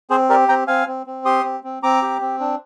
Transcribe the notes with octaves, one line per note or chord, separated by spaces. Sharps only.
C4 G#4 C5
G4 A#4 D5
C4 G5 A#5
C4 F5 G#5
C4
C4
G4 C6 D#6
C4
C4
C4 A#5 D6
G4
C4
D4